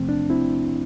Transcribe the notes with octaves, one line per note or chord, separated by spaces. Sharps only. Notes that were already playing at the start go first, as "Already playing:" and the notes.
Already playing: E2 C3 F3 A3 C4
D4
C4 E4